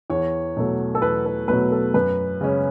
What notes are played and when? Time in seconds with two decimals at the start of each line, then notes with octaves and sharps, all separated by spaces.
0.10 E2 C#5
0.57 B2 F#3 A3
0.95 A4
1.02 E2 B4
1.26 A4
1.48 B2 F#3 A3 B4
1.72 A4
1.94 F#2 B4
2.41 C#3 G#3 C#4